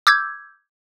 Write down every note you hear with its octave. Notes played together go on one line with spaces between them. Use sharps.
D6 E6 G6 G#6